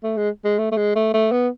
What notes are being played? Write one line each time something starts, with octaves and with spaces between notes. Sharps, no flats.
A3
G#3
G#3
A3
A3
G#3
A3
A3
B3